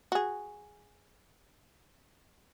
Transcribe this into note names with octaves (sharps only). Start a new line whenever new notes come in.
F#4 G#4